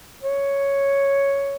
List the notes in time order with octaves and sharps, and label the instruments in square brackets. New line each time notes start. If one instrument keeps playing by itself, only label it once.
[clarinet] C#5